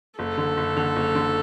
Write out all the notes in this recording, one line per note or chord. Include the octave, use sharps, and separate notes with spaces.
F#1 A4
D3
F#1
D3
F#1
D3